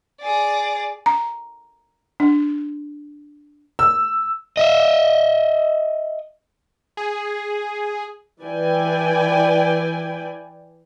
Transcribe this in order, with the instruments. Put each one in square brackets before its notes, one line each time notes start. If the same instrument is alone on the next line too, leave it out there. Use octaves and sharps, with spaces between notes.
[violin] G#4 D5
[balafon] A#5
D4
[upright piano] E6
[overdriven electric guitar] D#5 E5
[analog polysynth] G#4
[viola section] E3 B4 D5 G5 G#5